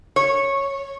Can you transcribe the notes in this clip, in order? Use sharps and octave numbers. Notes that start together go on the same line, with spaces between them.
C#5